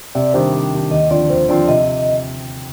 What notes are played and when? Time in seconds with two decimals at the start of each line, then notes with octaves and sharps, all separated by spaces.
0.15 C3 D5
0.33 D#3 G3 D4 G4 C5
0.53 C3
0.73 D#3 G3 D4 G4
0.91 D#2 D#5
1.10 D3 F3 C4 F4 D5
1.29 D#2 C5
1.49 D3 F3 C4 F4 D5
1.68 C3 D#5